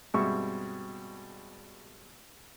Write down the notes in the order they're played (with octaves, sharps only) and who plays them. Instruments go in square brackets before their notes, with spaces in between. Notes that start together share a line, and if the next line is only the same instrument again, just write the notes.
[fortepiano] G2 B2 G#3 C4 E5 C#6